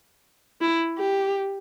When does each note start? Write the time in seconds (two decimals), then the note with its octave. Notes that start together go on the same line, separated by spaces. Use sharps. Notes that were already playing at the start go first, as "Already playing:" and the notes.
0.61 E4
0.99 G4